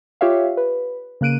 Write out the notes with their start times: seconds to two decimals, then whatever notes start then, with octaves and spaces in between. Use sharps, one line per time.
0.21 F4 G4 C#5 E5 F5
0.57 B4
1.21 C#3 A#3 F#6 D7 D#7